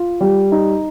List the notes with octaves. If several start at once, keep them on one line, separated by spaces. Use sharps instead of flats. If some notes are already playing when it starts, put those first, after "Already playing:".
Already playing: F4
G3
D#4